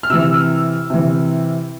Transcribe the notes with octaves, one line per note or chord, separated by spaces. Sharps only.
F6
C3 E3 E6
C3 E3